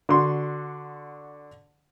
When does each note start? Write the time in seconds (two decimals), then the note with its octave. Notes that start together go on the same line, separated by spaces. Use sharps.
0.09 D3 F#4 C6